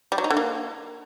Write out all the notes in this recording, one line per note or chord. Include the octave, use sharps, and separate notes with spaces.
G3
F#3
D#4
D3
A#3